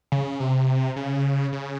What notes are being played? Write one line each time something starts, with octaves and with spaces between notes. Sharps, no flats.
C#3
C3
C#3
C#3